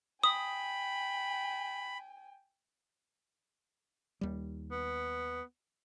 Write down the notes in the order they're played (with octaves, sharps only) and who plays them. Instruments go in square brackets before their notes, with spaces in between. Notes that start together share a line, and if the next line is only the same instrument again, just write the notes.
[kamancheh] G5 G#5 [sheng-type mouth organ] B5 [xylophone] D#6
[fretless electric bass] D#2 G3
[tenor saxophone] B3